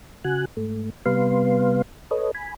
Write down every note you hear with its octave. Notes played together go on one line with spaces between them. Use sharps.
C#3 F#4 G#5 F#6
G#2 A3
C3 G3 B3 B4 F5 C6
A4 B4 C#5 D#5
G#5 B5